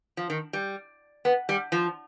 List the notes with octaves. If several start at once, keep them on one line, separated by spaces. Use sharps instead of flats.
F3
D#3
G3
B3
G3
F3